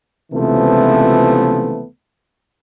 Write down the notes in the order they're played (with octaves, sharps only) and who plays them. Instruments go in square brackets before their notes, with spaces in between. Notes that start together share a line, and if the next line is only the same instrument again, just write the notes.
[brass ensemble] C#2 C3 E3 F3 A3 B3